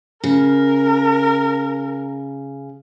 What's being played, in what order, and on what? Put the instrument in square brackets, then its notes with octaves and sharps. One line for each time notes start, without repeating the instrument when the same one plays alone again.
[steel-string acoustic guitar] C#3 [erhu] A#4